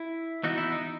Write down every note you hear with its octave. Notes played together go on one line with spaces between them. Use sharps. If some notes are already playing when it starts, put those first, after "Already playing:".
Already playing: E4
E3 B3 D#4 F#4
E4
D#4